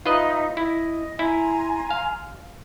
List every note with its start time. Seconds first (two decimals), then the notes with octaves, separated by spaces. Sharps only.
0.06 D#4 F4 B4 D#5 E5
0.57 E4 D#5
1.19 E4 G#5 A#5 C6
1.91 F5